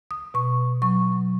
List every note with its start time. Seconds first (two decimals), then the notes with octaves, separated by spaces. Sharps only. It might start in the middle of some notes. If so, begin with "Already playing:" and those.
0.11 D#6
0.34 B2 C#6
0.82 F#3 C#6